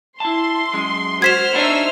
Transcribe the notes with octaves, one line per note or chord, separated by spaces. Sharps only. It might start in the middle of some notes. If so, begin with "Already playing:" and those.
E4 A5 C6
F#2 G#3
F#4 C5 F6 G#6 B6 E7
B3 D4 D#4 C#5 E5 E6